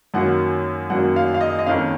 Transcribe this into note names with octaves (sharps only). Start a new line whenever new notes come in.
F#2 D#3 F#3 A#3 C#4 F#5
F#2 D#3 F#3 A#3 C#4 F#5
F5
F5
D#5
D#5
F2 D#3 A#3 C#4 F5